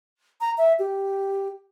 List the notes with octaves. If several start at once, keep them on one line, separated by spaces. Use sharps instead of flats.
A#5
E5
G4